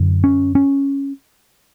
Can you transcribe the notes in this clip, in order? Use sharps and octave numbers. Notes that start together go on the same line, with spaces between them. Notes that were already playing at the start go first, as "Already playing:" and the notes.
Already playing: F#2 D3
C#4
C#4